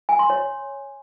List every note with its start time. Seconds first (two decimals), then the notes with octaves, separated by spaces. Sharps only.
0.09 G#5
0.19 C6
0.30 C#5